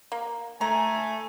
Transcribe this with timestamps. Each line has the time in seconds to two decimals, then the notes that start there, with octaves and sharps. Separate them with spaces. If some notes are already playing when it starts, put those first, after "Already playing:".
0.12 A#3
0.61 A3 G#5 A#5